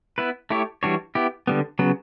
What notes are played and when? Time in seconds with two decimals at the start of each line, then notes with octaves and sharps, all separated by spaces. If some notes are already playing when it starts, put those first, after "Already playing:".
0.18 B3 E4 B4
0.50 A3 E4 G4 C#5
0.83 E3 G3 D4 F#4 C#5
1.15 B3 E4 G4
1.47 D3 G3 B3
1.79 C#3 F#3 B3